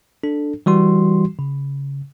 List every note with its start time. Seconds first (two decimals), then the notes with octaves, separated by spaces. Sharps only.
0.23 D4 A4
0.66 E3 G3 F#4 C6
1.39 C#3